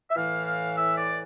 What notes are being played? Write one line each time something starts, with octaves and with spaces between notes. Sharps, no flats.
E5
A2 E3 F5
E5
D5